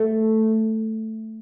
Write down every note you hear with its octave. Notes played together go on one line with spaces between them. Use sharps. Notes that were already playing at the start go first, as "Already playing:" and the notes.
Already playing: A3